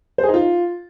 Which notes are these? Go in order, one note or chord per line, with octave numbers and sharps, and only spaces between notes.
C5
G#4
D#4
F4